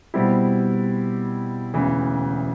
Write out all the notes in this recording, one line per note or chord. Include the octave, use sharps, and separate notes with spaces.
B2 G3 C4 E4 G4
E1 D2 C#3 E3